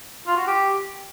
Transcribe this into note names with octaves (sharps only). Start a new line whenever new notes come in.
F4
F#4
G4